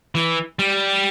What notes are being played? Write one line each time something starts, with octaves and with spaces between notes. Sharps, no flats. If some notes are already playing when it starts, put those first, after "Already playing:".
E3
G3